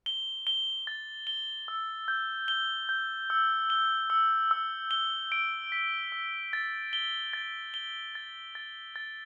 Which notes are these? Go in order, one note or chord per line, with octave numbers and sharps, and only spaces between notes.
G7
G7
A6
G7
E6
G6
G7
G6
E6
G7
E6
E6
G7
D7
B6
E6
A6
G7
A6
G7
A6
A6
A6